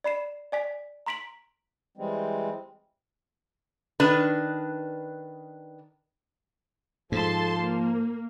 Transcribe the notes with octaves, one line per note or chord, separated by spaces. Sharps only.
D5 B5 C7 E7
D5 G#5 B6
A#5 C6 B6 D7 F#7
E3 G3 G#3 C4
D#3 D4 B4
G#2 F3 A4 A5 C6
A#3